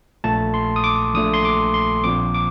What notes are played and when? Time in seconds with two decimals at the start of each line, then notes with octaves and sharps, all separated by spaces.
0.24 A#1 A#2 A3 A5
0.54 C6
0.76 D#6
0.84 D6
1.14 A#1 A#2 A3 D#6
1.34 C6
1.45 D6
1.74 C6
2.04 A#1 A#2 F3 C4 D6
2.35 D6